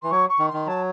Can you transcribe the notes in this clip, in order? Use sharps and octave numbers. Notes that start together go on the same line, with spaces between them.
E3 C6
F#3 C#6
C#6
D#3
C6
D#3
F#3 A5